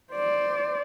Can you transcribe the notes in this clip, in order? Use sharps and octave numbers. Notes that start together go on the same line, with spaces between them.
C5 D5